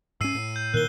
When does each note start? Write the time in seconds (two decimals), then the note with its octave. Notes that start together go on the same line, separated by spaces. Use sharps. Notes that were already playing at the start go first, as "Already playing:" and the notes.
0.21 G#2 C#4 E6 C7 D#7
0.35 A2
0.56 G6
0.74 A#2 D#3 A#4 F#6 G7